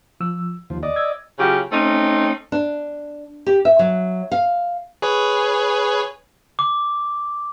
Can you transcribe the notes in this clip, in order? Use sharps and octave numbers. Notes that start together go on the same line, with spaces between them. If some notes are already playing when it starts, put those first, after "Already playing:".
F3 E6
D#2 F3
D5 D#5
E6 G#6
C#3 F#3 F4 G4
A3 C4 C#4 D#4
D4
G4
E5
F#3
F5
G#4 B4 C#5
D6